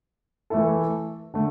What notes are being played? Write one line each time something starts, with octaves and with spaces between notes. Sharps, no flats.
E3 A3 E4 A4
D3 A3